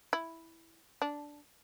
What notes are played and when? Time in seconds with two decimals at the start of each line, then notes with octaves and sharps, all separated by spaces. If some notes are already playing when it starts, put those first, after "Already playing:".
0.13 E4
1.02 D4